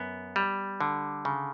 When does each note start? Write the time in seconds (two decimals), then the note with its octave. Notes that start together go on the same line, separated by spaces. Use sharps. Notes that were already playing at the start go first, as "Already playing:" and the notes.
Already playing: F#2 B3
0.36 G3
0.81 D3
1.25 C#3